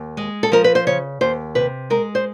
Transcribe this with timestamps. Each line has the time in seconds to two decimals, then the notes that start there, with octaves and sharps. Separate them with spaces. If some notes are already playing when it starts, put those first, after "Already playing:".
Already playing: D#2
0.17 G#3
0.43 A4
0.52 F3 A#4
0.64 B4
0.75 C5
0.87 C#3 C#5
1.21 D#2 C5
1.55 C3 B4
1.90 G#3 A#4
2.15 C5